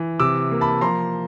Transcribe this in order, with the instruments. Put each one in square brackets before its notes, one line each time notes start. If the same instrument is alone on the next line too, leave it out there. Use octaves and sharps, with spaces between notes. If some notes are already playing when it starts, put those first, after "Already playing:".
Already playing: [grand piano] E3
C3 D6 E6
A#3
A5 B5
F3 A#5 C6